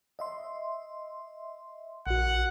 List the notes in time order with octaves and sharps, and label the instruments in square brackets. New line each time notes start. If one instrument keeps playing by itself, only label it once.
[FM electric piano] D#5 E5 C6
[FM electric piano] A#1 F#4 [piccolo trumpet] F#5